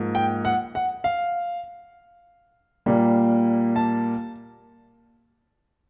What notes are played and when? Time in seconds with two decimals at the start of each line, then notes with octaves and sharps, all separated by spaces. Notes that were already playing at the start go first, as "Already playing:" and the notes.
Already playing: G#2 F3 A#3
0.15 G5
0.45 F#5
0.75 F#5
1.04 F5
2.86 A#2 G3 A#3
3.76 A5